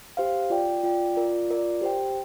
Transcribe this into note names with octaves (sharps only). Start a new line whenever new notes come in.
G4 C5 F5
F4 D5 G5
F4 D5 G5
F4 A#4 D5
F4 A#4 D5
G4 C5 G5